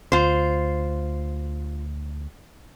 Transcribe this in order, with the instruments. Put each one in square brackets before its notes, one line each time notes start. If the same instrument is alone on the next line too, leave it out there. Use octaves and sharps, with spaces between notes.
[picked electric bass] D2 [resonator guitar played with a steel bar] F4 C5